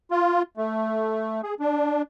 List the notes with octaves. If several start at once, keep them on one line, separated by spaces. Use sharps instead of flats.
F4
A3
G#4
D4